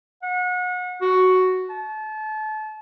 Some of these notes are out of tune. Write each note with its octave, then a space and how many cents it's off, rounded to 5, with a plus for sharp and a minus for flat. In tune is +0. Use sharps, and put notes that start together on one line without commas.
F#5 -35
F#4 +5
A5 -30